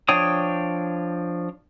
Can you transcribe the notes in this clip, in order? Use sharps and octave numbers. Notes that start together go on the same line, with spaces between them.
F3 D4 C#5 G5 D#6